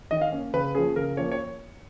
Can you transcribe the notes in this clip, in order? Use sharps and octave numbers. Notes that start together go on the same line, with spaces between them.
D#3 D#5
F5
A#3 C#4
C#3 B4
F3 A#3 C#4 G#4
C#3 A#4
F3 A#3 C#4 C#5
C#5